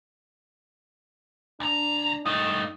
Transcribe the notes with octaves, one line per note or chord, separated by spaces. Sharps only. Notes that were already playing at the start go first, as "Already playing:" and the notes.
D2 D4 A#5
G2 A3 D#4 D#6